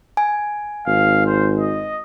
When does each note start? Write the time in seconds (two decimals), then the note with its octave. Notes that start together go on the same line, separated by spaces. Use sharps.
0.17 G#5
0.86 G#1 F5
1.26 C5
1.59 D#5